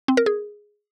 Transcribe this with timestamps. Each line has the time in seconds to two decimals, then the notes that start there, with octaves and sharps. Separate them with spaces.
0.08 C4
0.17 A#4
0.26 G#4